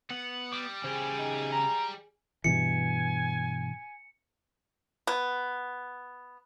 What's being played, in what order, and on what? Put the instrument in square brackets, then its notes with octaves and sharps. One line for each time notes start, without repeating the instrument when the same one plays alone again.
[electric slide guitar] B3 [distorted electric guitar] F#5
[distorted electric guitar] G3 [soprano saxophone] D6
[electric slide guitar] C#3 G4 [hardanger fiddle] G#4 [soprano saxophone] C5
[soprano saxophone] D#4
A#5
[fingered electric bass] G2 B2 E3 [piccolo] G#5 [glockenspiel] C#7
[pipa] B3